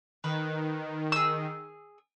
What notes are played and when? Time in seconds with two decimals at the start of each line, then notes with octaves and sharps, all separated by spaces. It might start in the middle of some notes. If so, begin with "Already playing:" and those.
0.24 D#3 B4
1.12 G#4 E6